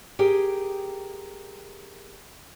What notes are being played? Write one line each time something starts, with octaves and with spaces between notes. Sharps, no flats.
G4 G#4 A#4 G5